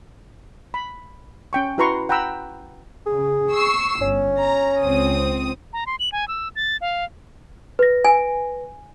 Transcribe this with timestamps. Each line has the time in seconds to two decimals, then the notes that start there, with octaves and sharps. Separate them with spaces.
0.74 B5
1.53 C#4 G5 C#6
1.78 E4 F#4 B4 A#5 C6 C#6
2.09 F#5 G5 A#5 B5 E6
3.06 C#3 G#4
3.51 C#6 E6 C7
4.02 G1 C#4
4.40 A#5
4.81 C#2 C4 D#6
5.73 A#5
5.86 C6
6.00 F#7
6.12 G#5
6.28 E6
6.56 A6
6.81 F5
7.79 B4 A#6
8.05 G#5